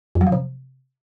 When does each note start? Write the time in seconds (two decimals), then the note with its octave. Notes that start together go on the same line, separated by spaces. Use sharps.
0.15 F2
0.21 F#3
0.27 F3
0.32 C3